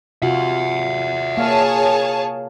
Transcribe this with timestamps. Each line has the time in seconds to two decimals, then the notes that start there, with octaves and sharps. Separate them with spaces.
0.22 C3 F4 F#4 E5 F#5
1.37 A#3 G#4 C#5 F5 A5